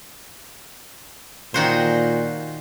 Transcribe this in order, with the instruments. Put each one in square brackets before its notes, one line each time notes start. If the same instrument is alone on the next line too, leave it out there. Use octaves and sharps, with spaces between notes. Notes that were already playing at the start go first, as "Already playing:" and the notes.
[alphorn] A#2 [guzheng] D#3 F#4 C5